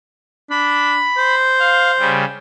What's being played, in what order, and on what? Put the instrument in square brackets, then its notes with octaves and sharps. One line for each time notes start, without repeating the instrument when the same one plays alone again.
[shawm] D4 [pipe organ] B5
[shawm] C5
[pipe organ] F5
C#3 G3